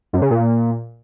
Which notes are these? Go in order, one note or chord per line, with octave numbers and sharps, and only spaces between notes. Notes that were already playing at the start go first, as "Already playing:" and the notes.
F#2
C#3
A#2